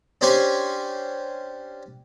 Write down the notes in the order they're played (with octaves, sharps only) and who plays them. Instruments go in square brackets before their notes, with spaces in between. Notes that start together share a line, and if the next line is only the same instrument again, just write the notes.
[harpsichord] C#4 D4 G4 C5 G#5 C#6